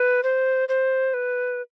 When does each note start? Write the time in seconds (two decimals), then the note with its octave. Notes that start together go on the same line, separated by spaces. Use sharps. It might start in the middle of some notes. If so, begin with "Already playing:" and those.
Already playing: B4
0.23 C5
0.69 C5
1.14 B4